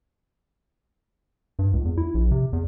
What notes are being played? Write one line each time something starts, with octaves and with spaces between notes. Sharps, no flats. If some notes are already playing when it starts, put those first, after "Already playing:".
G2
C#2
E2
E4
A#1
C3
E2